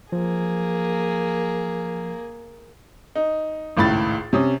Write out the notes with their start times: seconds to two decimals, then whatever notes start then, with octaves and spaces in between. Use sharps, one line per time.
0.12 F3 A#3 G#4
3.15 D#4
3.77 G#1 C#2 A2 B5 A6
4.33 C3 C#4 D#6